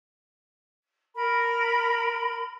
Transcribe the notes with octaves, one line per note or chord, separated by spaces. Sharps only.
A#4 B5